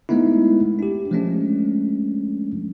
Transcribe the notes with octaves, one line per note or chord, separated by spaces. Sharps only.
G#3 A3 B3 D#4 E4
D4 G4
F3 G#3 A3 C#4 D4